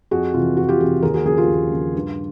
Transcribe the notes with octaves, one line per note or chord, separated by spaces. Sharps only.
F2 F#4 G#4
C3 E3 F4
F2 F#4
F4 G4
C3 E3 F#4 G#4
D#2 G#4 A#4
F#4 G#4
C#3 F3 F#4 G#4
F4 G4
D#2
C#3 F3
G2